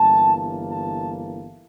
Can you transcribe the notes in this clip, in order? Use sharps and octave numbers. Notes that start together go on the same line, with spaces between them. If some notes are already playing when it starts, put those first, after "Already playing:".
Already playing: G1 G2 E3 A#3 E4 A5
A5